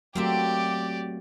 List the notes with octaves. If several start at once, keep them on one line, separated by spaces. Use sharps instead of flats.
F#3 A3 A#3 C4 F#4 G4 D5 E5